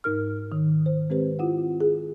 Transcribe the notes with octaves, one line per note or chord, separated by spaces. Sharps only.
G#2 D#4 A#4 F6
D#3
C5
G#3 C4 G4 B4 C5
E4 F4 F#5
G#4